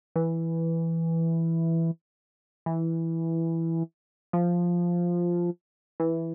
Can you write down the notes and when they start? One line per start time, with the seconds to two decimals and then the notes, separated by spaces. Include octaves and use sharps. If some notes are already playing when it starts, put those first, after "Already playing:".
0.16 E3
2.66 E3
4.33 F3
6.00 E3